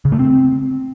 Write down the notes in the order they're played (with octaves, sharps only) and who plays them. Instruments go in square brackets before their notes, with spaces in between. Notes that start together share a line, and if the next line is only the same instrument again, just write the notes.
[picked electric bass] C#3
A3
C4